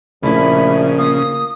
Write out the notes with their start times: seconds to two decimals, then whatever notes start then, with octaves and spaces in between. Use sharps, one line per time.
0.23 A#1 C#3 A3 D4 E4 B5
0.98 A#3 F4 D#6